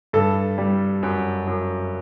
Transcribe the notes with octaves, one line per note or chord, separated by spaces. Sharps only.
G2 A4
G3
F#2
F#2